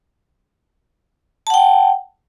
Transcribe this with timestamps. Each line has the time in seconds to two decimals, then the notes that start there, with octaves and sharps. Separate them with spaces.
1.47 A5
1.50 F#5
1.54 G5